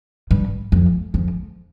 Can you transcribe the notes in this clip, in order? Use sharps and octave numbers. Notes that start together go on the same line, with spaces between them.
G2
F2
F2